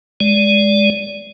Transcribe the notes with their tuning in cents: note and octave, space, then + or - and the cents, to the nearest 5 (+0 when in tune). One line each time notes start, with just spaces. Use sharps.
G#3 +0 D5 -20